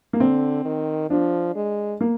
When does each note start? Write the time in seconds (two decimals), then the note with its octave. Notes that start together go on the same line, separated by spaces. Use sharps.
0.13 A#3
0.20 D3 C4
0.65 D#3
1.10 F3 D4
1.56 G#3
2.01 A#3